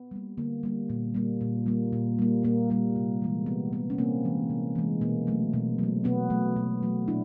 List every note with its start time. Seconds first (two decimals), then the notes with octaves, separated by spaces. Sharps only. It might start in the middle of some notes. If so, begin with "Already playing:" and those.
Already playing: B3
0.11 G3 A#3
0.37 D3 A#3
0.63 G3 A#3
0.90 A#2
1.14 G3 A#3
1.41 A#2
1.66 G3 A#3
1.93 A#2
2.19 G3 A#3
2.43 A#2 A#3
2.70 G3 A#3
2.96 C3
3.22 E3 G#3
3.46 C3 B3
3.72 E3 G#3 B3
3.90 C#4
3.98 C3 A#3 C4
4.25 E3 G#3
4.50 C3
4.75 E3 G#3
5.01 B2 A#3
5.27 F#3 A3
5.53 B2
5.78 F#3 A3
6.04 B2 B3
6.30 F#3 A3
6.56 B2
6.83 F#3 A3
7.08 A#2 D4 E4